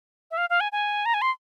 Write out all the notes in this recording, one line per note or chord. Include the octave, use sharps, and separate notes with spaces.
E5
F5
F5
G#5
G#5
A#5
G#5
C6